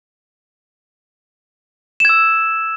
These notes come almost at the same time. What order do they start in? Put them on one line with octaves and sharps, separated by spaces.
E7 G#6 E6